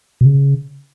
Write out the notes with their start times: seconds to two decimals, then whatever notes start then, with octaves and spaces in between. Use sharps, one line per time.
0.21 B2
0.25 C#3